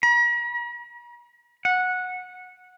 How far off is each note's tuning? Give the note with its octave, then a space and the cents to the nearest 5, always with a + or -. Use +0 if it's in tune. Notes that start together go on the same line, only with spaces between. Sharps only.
A#5 +45
F#5 -15